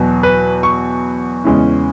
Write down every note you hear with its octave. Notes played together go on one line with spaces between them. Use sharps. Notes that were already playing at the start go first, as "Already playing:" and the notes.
Already playing: E2 B2 F#3
B4
C#6
E2 C#3 G#3 C#4 E4